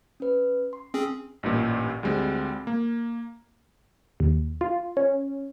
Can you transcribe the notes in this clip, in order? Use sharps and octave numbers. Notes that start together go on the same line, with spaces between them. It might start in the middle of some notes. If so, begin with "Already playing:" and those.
C#4 B4
C6
C4 C#4 G#4
A1 G2 A#2
D2 G3 G#3 C4
A#3
D#2
F4
C#4